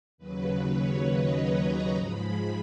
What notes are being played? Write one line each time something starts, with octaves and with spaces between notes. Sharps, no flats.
D#2 C#3 F#3 B4
C#5
D#5
A#5
G#2 F3 G#3 B5